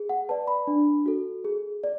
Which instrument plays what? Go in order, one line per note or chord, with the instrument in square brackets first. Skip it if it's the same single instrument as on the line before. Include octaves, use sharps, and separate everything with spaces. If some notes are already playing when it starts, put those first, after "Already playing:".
Already playing: [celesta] G#4
F#5
B4 D5 A5
B5
D4
F#4 A4
G#4
D5